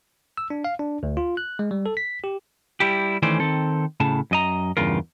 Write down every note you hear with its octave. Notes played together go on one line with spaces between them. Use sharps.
E6
D4
F5
D4
D2
F4
F#6
G#3
G3
A4
B6
G4
G3 E4 G4
D#3 E3 A3 C#4 C5 D5
D#3 C4 A4
A2 C#3 A5
F#2 D#5 A#5
E2 G2 C#3 F4 A#4